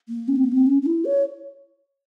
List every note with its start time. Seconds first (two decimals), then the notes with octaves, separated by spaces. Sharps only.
0.09 A#3
0.28 C#4
0.36 C4
0.44 A#3
0.52 C4
0.66 C#4
0.82 C#4
0.86 E4
1.05 C#5